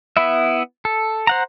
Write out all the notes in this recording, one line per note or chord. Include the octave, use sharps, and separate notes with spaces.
B3 E4 E5
A4
C5 F#5 A#5